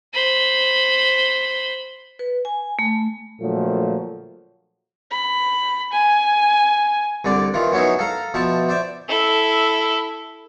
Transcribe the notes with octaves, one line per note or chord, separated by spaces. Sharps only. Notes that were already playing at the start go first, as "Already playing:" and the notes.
C5 B5
B4
G#5
A3
A#2 D3 F3 F#3 A3
B5
G#5
C2 D3 D5
D#3 E3 F4
F#3 B3 C#4 D#4 E4
A4 F5 A#5
B2 F3 E5 A5
C5 D5 E5
E4 A4